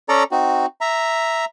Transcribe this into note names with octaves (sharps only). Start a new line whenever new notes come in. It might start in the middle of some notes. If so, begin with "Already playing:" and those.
C#4 A4 D5 A#5
C4 D#4 F#4
E5 A#5